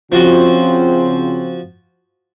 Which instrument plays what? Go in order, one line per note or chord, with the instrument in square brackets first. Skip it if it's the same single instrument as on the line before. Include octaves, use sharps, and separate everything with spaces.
[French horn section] C#3 C4 F4 [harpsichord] F3 F#4